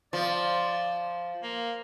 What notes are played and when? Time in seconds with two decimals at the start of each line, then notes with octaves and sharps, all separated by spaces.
0.13 F3 D5
1.43 A#3